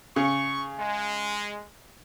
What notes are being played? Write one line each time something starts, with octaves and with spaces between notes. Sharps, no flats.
C#3 C#6
G#3